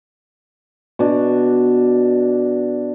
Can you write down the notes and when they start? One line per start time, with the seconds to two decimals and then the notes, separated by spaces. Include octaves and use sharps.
0.99 B2 D4